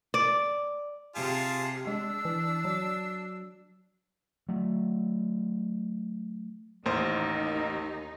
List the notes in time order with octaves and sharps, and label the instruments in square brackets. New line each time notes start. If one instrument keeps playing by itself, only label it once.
[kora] D5
[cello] C3 [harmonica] F4 G#4 A5
[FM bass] G#3 [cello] D4 [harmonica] E6
[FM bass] E3
F#3
[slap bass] F#3 A3
[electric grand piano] A1 A#3 C5 [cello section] D#2 D#4